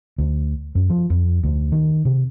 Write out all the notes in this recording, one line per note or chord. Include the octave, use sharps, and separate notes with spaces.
D2
F#2
F3
F2
D2
D#3
C3